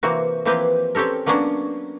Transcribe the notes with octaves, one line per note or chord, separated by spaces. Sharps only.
C3 E3 A#3 C4 F#4
E3 F3 A#3 C4 G4 B4
C4 C#4 G4 A4 A#4
F#3 A#3 B3 C#4 D4 F#4